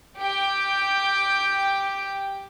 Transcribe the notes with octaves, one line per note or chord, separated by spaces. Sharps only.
G4 G5